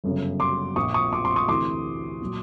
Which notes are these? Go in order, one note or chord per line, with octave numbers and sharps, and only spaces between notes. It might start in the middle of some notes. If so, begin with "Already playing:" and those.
G1 F#2 C#3
C6 D6
A#1 A#2 F3 C#6 D#6
C#6 D#6
C6 D6
C6 D6
C#6 D#6
D2 C3 E3 C6 D6
A#2 F#3